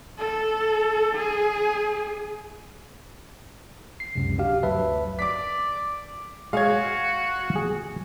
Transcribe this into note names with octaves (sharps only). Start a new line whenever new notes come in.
A4
G#4
C7
C#2 F#2 C3
D4 F#4 G4 F5
D2 G2 F#3 B4 E5 A5
D5 D6 B6
G#3 F#4 G#4 C#5 F5 G#6
G#4